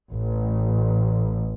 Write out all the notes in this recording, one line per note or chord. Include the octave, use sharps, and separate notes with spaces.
A1